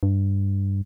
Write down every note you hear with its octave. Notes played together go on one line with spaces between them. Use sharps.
G2